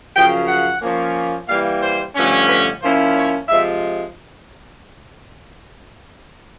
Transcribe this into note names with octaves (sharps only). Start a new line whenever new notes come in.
F#2 C#3 F3 G5
F#5
F3 A#3 C#4
E3 G3 A#3 F5
C5
G2 D3 F3 A3 C#4
B4
F3 A#3 C#4 E4 C5
C#5
C3 F3 G#3 E5